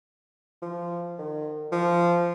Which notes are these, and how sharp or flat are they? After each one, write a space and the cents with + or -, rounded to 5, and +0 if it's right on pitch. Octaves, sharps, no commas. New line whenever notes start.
F3 -15
D#3 -40
F3 -15